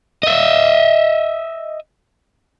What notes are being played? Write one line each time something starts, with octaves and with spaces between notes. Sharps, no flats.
D#5 E5